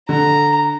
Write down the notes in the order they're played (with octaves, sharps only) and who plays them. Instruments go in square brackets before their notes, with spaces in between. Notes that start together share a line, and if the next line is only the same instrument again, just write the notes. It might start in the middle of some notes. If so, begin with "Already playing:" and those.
[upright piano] D3 [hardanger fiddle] A#5